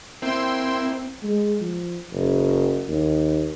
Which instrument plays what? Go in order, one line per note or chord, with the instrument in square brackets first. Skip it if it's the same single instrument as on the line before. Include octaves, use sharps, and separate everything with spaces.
[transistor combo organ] A#3 E4 [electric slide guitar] C4 [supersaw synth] G5 C6 E6
[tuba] G#3
F3
F#1
D#2